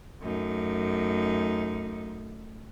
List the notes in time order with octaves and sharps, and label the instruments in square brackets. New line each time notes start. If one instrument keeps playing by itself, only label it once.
[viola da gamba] F#2 A3 D#4